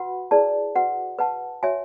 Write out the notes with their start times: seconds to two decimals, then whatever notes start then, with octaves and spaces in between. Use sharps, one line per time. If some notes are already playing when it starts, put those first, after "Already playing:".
Already playing: F#4 B4 F#5 B5
0.31 E4 G#4 B4 D5 A5
0.76 F#4 B4 F#5
1.18 B4 F#5 A5
1.63 F#4 C#5 E5 G#5